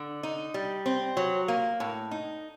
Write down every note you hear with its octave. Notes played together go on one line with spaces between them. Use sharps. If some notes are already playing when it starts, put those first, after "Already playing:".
Already playing: D3
D#4
G3
C4
F#3
A#3
A2
D#4